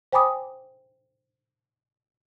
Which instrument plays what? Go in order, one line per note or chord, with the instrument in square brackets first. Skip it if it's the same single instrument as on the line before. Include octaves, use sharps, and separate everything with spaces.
[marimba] C5 G5 G#5 B5 D6 D#6